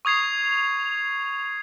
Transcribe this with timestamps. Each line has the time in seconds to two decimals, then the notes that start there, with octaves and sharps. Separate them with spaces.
0.05 C#6 D#6 G#6 C7 F7